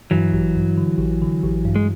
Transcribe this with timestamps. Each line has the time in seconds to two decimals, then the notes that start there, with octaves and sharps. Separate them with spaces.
0.11 G2 E3 F#3
0.33 A1
0.56 G2
0.78 D3
0.99 A1
1.22 D3
1.44 A1
1.65 G2
1.76 G#3